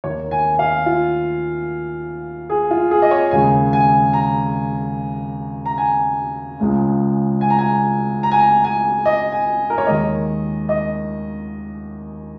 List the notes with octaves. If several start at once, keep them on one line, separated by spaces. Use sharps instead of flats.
D#2 D#3 A#3 C#5
G#5
G#5
F5
F4
G#4
F4
G#4
D#5
C#5
D#2 C#3 G#3 G#5
G#5
A#5
A#5
G#5
C#2 C#3 G#3
G#5
A#5
G#5
A#5
G#5
A#5
G#5
D#5
G#5
A#4
C#5
D#2 D#3 G#3 D#5
D#5